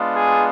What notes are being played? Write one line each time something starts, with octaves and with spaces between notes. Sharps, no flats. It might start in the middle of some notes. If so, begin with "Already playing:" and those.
Already playing: G#3 B3 D4 F4
G#4